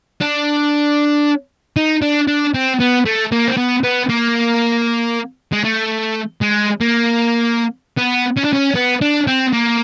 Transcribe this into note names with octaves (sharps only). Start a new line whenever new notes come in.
D4
D#4
D4
D4
C4
B3
A3
A#3
C4
B3
B3
A#3
G#3
A3
G#3
A#3
B3
C#4
D4
C#4
B3
D4
C4
A#3